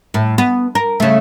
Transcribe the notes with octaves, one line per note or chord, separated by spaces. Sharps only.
A2
B3
A#4
C#3 A3